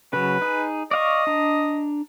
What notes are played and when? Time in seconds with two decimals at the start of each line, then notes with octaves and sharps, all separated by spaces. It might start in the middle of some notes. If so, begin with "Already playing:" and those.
0.13 C#3 F#3 B4
0.42 D#4 G#4
0.91 D5 D#5 F5 C#6
1.27 D4 A#5